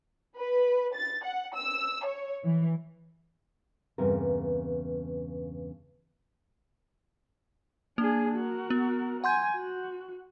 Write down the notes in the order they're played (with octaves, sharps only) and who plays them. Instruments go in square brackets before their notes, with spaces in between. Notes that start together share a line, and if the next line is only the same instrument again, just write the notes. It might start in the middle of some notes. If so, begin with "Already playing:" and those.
[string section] B4
A6
F#5
E6
C#5
E3
[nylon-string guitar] E2 G2 C#3 C4 A#4
[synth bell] A#3 [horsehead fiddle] D4 G#4
[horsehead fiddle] F#4 A#4
[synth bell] B3
[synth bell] F#5 C6 G6 [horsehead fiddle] G#5
[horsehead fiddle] F#4